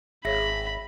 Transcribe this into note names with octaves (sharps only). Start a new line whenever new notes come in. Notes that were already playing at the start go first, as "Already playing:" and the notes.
G#1 G#4 C#5 E5 F5 B5 A#6